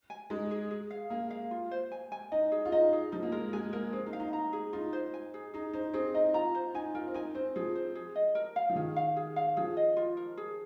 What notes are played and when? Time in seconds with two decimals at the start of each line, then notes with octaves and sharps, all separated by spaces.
0.10 G#5
0.30 G#3 D#4
0.51 G#4
0.71 G#4
0.91 F5
1.10 A#3 G#4
1.31 F5
1.51 F4
1.71 C5
1.92 G#5
2.12 G#5
2.32 D#4 D#5
2.52 G#4
2.65 F4
2.72 D#4 D#5
2.93 G#4
3.12 F3 D#4
3.22 A#3
3.32 G#3 A#4
3.53 G#3 G#5
3.73 A#3 A#4
3.92 C4 G#4
4.06 D#4
4.13 F5
4.20 D#4
4.33 A#5
4.53 G#4
4.73 D#4 F4
4.93 C5
5.14 G#5
5.34 G#4
5.54 D#4 G#4
5.73 D#4 C5
5.93 C4 G#4
6.14 D#4 D#5
6.34 F4 A#5
6.55 C5
6.74 D#4 G#5
6.95 F4 A#4
7.08 C4
7.14 D#4 G#5
7.35 C4 C5
7.56 F3 G#4
7.75 C5
7.95 G#4
8.16 D#5
8.35 A#4
8.56 F5
8.69 F3
8.75 D#3 G#4
8.96 F5
9.16 G#4
9.36 F5
9.57 F3 G#4
9.77 D#5
9.97 F4
10.17 A#4
10.37 G#4